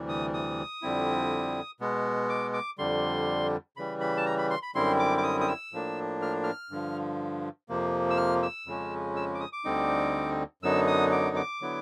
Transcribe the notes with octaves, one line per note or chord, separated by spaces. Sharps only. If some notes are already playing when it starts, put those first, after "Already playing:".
Already playing: D2 C3 E3 G3
D#6
D#6
F2 D3 G3 C4 E4
B2 G#3 B3
D6
D6
F2 D3 G3 C6
C#3 E3 G3 B5
B5
A5
A#5
B5
C6
B5
F#2 D3 G3 C4 E4 C6
D6
D6
D#6
D#6
E6
A2 F3 A#3 D4
F6
F6
G2 D3 F3
F2 C3 F3 A#3
E6
F6
E6
F2 C#3 F3 G#3 C#4
E6
D6
D#6
D6
D2 D3 G3 C4 D#4
F#2 D3 F#3 B3 D#4 E6
D#6
D6
D6
D3 F#3 B3 E4